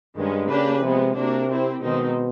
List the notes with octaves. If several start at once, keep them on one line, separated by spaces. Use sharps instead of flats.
G2 D#3 G#3 C#4
C#3 A#3 D4 G4 B4
C3 F3 G#3 B3
C3 A#3 D4 F#4 A#4
C4 E4 G4
B2 D#3 G#3 C4 D#4